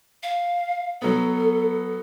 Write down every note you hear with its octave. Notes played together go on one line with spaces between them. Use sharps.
F5
F#3 B3 A4